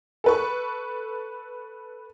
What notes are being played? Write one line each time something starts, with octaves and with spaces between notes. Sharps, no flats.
A4 B4 C#6